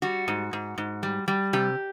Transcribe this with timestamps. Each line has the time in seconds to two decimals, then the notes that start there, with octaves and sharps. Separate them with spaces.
0.02 G3 F#4
0.28 G#2
0.53 G#2
0.78 G#2
1.03 G3
1.28 G3
1.53 C3 G4